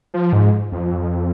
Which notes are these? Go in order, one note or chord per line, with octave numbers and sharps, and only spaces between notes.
F3
G#2
F2